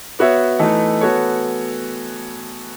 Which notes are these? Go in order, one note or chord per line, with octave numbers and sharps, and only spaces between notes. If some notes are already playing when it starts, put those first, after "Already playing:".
B3 F#4 C#5 E5
E3 A3 D#4 A4
B3 F#4 A4 C#5